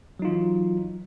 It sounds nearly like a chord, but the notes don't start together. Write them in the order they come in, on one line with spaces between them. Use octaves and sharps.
F#3 D#4 F4 E3